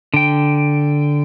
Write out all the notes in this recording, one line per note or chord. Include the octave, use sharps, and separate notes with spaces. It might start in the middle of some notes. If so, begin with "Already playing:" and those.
D3 G5